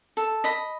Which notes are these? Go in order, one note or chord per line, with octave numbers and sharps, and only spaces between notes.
A4
D#5 B5